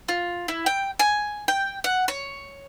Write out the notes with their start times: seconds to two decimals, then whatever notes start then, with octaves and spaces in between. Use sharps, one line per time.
0.08 F4
0.48 E4
0.66 G5
0.99 G#5
1.48 G5
1.84 F#5
2.08 C#5